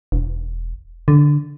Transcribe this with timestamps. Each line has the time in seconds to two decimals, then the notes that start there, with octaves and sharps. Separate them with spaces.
0.12 E1
1.08 D3